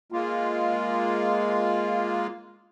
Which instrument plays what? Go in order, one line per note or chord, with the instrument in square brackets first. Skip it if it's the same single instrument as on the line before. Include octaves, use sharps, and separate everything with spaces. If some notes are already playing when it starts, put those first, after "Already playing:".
[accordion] G#3 A#3 F4